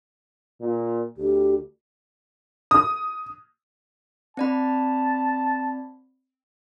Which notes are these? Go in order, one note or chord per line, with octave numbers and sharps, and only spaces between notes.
A#2
D2 G4
D#6
C4 D5 A5 B5